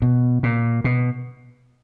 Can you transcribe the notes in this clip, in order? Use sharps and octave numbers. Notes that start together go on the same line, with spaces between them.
B2
A#2
B2